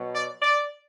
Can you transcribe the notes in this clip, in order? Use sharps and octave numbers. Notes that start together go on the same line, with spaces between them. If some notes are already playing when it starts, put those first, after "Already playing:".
Already playing: B2 F#3
D5
D5